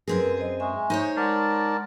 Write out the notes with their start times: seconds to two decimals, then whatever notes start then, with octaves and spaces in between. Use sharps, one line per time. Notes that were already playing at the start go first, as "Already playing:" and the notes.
0.08 F#2 C4 G#4 A#4 B4 C6
0.37 C5 D#5
0.60 G#3 E5 G#5 C#6
0.90 D#4 C5 C#5
1.17 G#3 A#4 D5 F#5 A5 C6